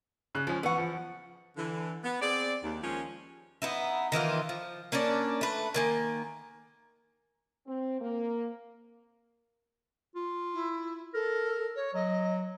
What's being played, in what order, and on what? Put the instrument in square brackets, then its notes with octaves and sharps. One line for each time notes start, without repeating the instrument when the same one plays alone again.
[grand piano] C#3 F#6
[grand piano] F3 C#4 [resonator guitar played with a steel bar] G#3
[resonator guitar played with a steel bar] E2 F#5 [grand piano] B3 C#6
[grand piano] F3
[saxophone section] D3 E3
B3
C4 G#4 D5
D#2
D#3 F3 G#3 A#3 C#4
[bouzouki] B3 D#4 E4
D#3 E3 A#3 F4
F3
A#3 C#4 D4 D5
A3 B4
D#3 A#3 G#5
[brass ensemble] C4
A#3
[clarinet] F4
[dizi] E4
[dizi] A4 [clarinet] A#4
[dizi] C#5
[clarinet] F#3 [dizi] D#5